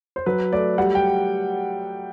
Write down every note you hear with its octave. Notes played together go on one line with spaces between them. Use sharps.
C5
F#3 B4
A3 D5
G3 F#5
G5